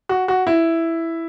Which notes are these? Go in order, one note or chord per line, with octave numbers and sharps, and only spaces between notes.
F#4
F#4
E4